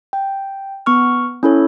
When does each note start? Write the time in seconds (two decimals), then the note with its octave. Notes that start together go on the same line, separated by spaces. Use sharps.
0.13 G5
0.86 B3 C#6 F6
1.43 C#4 E4 A4 C#5